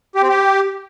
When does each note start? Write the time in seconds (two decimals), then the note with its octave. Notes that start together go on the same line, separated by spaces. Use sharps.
0.15 G4
0.22 C4
0.29 G4